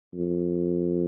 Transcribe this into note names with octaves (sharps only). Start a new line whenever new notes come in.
F2